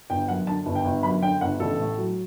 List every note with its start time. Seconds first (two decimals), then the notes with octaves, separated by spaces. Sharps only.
0.10 G1 G5
0.28 F#2 F#5
0.47 D3 A5
0.66 G1
0.75 G5
0.85 G1
1.03 F#2 B5
1.22 D3 G5
1.41 G1 F#5
1.60 A1 A4
1.79 A2
1.98 F#3